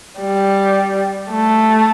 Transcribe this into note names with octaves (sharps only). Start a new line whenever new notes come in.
G3
A3